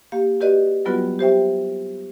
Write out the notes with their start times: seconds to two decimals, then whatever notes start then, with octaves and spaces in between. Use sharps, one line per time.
0.12 A#3 G4 F5
0.41 F#4 G4 B4 D5 D#5
0.85 F#3 G3 B3 F4 F#4 B4
1.19 G4 C5 E5 G5